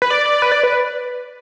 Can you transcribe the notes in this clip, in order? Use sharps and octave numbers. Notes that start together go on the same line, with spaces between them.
B4
D5
D5
B4
D5
B4